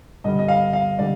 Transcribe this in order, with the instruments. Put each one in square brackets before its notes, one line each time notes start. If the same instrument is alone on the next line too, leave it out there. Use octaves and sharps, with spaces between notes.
[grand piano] G2 D3 G3 D#5
D#5
F5
F5
D3 G3 D5